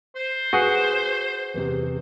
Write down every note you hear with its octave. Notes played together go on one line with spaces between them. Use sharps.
C5
F#4 G#4 B4 F#5
E2 C3